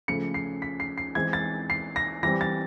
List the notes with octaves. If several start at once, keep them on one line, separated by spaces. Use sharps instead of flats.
C#3 F3 A3 C#7
C7
B6
C7
C7
E3 G#3 C4 G#6
A6
C7
A#6
E3 G3 C4 A#6
A6